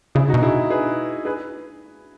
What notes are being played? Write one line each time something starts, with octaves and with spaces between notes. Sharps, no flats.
C#3 E4 G#4
D#4 F#4
B2
E4 G#4
G#4 B4
G#4 B4